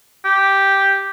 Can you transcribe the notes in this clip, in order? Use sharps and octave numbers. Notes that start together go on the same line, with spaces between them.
G4